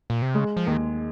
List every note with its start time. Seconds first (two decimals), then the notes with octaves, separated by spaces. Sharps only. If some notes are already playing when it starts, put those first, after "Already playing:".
0.10 A#2
0.22 C3
0.35 C#3 G#3
0.57 F3
0.67 D#2 D#3